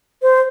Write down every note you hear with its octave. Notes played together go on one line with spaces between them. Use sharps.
C5